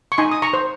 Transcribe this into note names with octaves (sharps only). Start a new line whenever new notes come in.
C#6
D#4 G#5 C6
D#6
A#5 C#6
C5